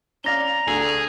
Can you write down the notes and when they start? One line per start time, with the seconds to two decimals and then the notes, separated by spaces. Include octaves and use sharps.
0.24 C#4 D5 F5 A#5 A#6 G7
0.68 D2 D3 G#4